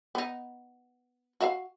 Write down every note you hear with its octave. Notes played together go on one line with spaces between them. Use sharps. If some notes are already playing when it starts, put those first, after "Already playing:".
B3 D#4
F#4 E5 F5